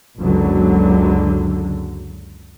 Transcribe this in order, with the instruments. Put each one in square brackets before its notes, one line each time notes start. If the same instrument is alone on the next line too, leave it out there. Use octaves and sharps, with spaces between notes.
[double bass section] F#1 C#2 D3 F#3